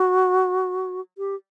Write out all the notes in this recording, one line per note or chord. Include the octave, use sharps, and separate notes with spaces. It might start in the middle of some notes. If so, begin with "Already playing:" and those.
Already playing: F#4
G4